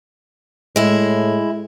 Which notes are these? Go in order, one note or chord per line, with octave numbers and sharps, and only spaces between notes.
A2 G#3 E4